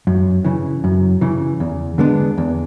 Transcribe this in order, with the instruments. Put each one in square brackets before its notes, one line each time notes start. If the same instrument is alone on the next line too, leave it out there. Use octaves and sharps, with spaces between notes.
[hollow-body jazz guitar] F#2
C#3 E3
F#2
C#3 E3
E2
D3 G#3 B3 D4
E2